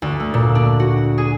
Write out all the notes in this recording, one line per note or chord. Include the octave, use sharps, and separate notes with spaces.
D2
A3
A#2
D4
F#4
G#4